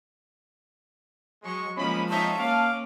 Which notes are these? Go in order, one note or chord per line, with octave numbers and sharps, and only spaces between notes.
F#3 G#3 C#6
F3 G#3 A#3 C#4 D#5 B5
C4 D#4 C#5 E5 F5 A5
A#3 C#4 F5 D6